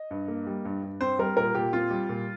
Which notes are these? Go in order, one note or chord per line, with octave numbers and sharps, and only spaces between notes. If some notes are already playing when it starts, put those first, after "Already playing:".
Already playing: D#5
G2
A#3
G3
G2
G2
C4 C5
G3 A#4
A#2 A#4
A#2 G4
C4 F4
G3
A#2